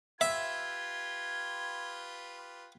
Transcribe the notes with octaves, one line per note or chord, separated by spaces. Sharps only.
F4 G4 B4 E5 G#6